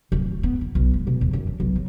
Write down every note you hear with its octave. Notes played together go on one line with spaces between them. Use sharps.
D1
A3
B3
E4
B1
G#3
B2
E2
F#2
D3
B1
F#3